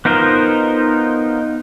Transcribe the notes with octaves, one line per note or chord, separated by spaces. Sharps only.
B3 D#4 F4 A#4 C5